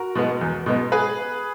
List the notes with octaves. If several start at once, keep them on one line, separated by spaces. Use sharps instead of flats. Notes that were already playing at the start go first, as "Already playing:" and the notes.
Already playing: F#4 A#4
B2 G#3 B3
E2
B2 G#3 B3
G#4 B4